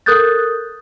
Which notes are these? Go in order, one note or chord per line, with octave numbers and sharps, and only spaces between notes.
A4 A#4 D#6 F#6 G6 A6